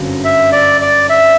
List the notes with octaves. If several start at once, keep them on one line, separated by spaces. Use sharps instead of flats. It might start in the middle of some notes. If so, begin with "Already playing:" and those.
Already playing: G1 F#2 F#3 C4
E5
D5
D5
E5